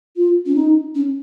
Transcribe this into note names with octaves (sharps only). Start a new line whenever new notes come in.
F4
C#4
D#4
C#4